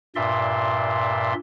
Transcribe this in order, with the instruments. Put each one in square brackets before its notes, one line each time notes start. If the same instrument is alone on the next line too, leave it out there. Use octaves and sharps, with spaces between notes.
[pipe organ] G2 A#2 D5 E5 C6